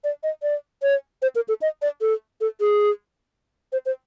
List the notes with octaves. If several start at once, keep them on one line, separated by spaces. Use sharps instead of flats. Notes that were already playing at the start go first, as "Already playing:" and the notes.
D5
D#5
D5
C#5
C5
A#4
A4
D#5
D5
A4
A4
G#4
C5
C5